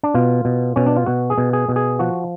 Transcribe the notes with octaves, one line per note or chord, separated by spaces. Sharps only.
D4
B2 F4
B2
B2 C#4
D4
F4
B2 F#4
G#4
B2
G#4
B2
G#4
F3 F#4